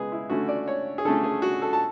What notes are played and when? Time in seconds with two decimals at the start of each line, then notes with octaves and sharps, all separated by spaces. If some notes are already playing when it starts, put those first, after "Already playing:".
Already playing: C#3 G#3 B3 G#4 B4
0.12 E4
0.30 D3 A3 C#4 F#4
0.48 D5
0.68 C#5
0.98 G#4
1.05 D3 A3 C#4 A4
1.23 G#4
1.42 F#4
1.62 A4
1.73 A5